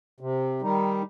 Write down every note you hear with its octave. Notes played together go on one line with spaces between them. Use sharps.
C3
D#3 G3 D#4